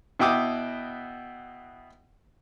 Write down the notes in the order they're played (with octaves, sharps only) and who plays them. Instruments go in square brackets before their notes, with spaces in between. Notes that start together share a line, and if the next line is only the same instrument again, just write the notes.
[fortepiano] B2 E4 F#4 G5 D6 D#6